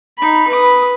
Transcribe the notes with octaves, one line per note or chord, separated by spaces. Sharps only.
D#4 B5
B4 D#6